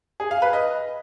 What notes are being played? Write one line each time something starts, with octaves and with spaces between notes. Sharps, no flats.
G#4
F5
B4
D#5